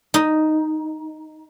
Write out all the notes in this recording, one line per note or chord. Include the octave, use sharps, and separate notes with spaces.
D#4